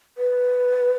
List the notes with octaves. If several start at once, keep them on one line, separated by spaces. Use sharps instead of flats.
B4